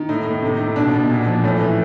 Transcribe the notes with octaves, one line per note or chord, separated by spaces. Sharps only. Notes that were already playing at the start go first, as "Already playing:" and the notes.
Already playing: D#3
A2 D#4
A2
C3
D#3
B2 D4
B2
A#2
F3
A2 C#4
E3